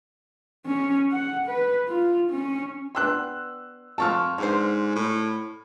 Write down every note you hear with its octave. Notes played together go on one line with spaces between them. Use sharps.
C#4
F#5
B4
F4
C#4
B3 D4 G4 C6 E6 F#6
F2 F4 A4 A5 C#6 F6
G#2 D3 C5
A2